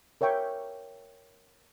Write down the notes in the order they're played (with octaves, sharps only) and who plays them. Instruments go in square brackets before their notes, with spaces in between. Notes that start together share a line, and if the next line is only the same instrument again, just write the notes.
[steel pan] A#4 C#5 E5 G5 C#6